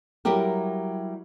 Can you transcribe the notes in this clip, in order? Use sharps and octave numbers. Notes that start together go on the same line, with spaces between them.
F#3 G3 E4 G4 A#4